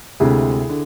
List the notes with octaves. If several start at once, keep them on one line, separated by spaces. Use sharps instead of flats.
D2 C3 G#3 E4 G#4
D3